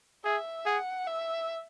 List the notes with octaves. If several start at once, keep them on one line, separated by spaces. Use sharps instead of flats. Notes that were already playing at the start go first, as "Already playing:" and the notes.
G#4 E5
G#4 F#5
E5